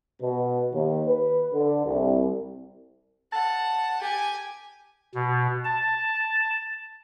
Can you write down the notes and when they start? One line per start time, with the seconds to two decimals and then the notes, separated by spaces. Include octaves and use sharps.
0.22 B2
0.72 D#2
1.07 B4
1.53 D3
1.86 C2
3.33 F#5 A5
4.01 G4 G#5
5.14 B2
5.65 A5